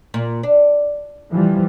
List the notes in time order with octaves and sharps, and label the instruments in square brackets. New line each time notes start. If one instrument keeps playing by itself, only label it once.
[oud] A#2
D4
[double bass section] E3 F3 G3